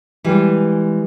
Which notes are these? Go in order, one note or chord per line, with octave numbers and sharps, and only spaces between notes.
E3 G3 G#3